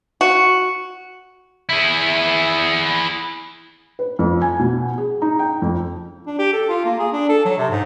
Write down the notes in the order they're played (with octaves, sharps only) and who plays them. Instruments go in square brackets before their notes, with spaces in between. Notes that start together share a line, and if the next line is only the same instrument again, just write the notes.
[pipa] F#4
[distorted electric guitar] E4 G#4
[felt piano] B4
F2
G#5
B2
G#4
D#4
G5
F2
[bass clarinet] D4
G4
A4
F4
A#3
G#4
D4
A4
F#3
C3
G#2